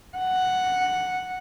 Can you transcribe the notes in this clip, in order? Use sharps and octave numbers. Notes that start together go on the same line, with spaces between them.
F#5